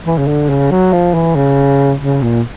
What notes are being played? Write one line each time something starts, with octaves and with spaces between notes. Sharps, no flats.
E3
C#3
D3
C#3
F#3
F3
E3
C#3
C#3
A#2